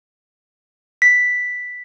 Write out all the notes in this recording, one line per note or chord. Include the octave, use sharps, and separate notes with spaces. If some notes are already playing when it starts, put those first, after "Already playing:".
B6